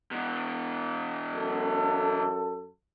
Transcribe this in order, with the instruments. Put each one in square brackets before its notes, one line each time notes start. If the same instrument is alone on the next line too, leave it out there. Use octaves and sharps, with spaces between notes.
[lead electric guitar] B2 E3
[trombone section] F#2 A4